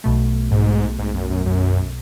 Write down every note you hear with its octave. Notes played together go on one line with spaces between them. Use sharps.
B1 B2 A3
G#2
G#2
F#2
F#2
F#2